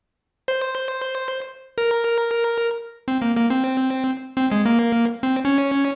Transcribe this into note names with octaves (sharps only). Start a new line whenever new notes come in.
C5
A#4
C4
A#3
A#3
C4
C4
G#3
A#3
C4
C#4